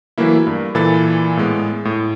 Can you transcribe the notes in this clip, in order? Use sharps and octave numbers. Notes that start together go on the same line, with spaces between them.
E3 F#3 A3 A#3 E4
G2
A#2 E3 A4 B5 A6
A2 G#3 B3
A2